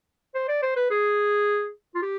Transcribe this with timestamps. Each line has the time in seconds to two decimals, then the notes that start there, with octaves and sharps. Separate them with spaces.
0.34 C5
0.48 D5
0.62 C5
0.76 B4
0.90 G#4
1.95 F4
2.02 G4